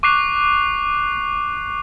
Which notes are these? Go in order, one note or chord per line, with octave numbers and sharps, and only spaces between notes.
C#6 D6 F#6 C7 F7